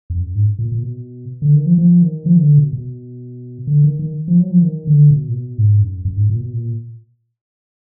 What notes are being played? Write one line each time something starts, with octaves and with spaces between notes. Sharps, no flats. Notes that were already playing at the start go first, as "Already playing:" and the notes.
F2
F#2
G#2
A#2
A#2
B2
D3
D#3
F3
F3
D#3
F3
D#3
D3
B2
B2
D3
D#3
D#3
F3
F#3
F3
D#3
D3
B2
A#2
B2
G#2
F#2
F#2
G#2
A#2
B2
A#2